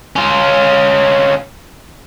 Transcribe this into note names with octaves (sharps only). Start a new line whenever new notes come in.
C#4 F4